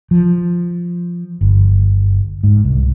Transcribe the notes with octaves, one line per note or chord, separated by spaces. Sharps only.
F3
G1
G#2
C2